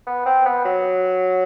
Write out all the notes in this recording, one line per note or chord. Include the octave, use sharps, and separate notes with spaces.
B3
C4
B3
F#3